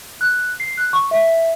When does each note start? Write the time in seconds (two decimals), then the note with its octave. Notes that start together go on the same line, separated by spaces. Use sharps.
0.21 F#6
0.60 C7
0.77 F#6
0.93 C#6
1.11 E5